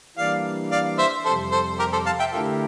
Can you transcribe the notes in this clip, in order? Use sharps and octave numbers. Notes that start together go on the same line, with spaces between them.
E3 G3 A#3 D4 D5 F5
D5 F5
C5 E5
F2 C3 G3 A4 C5
A4 C5
G4 A#4
A4 C5
F5 A5
E5 G5
D3 A3 E4 F4 G4 A4 A#4